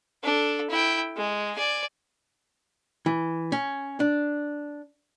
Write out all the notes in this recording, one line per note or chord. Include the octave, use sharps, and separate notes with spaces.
D4 A4
E4 G5
G#3
D5 G#5
E3
C#4
D4